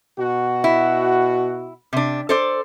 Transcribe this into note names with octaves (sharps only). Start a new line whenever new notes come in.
B2 F#4
E4
C3 D4
A4 C5 D5